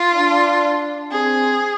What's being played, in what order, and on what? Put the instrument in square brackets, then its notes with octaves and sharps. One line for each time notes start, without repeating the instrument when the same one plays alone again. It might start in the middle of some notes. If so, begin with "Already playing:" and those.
Already playing: [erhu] F4
[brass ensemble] D4
[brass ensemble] C4 [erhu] G#4